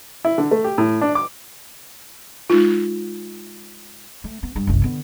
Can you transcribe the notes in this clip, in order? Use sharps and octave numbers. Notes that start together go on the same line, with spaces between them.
E4
D3
A3
G4
A2
D4
D6
G#3 D#4 F4
A3
B3
G2
F#1 C2
D3 B3